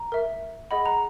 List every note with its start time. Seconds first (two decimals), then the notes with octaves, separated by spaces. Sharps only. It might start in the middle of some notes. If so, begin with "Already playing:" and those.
Already playing: A#5
0.12 A#4 E5
0.71 G#4 D#5 F#5 B5
0.86 A#5